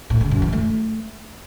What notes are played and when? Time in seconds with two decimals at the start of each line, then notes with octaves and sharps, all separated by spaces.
0.10 A2
0.21 C#3
0.31 F#2
0.42 E3
0.53 A3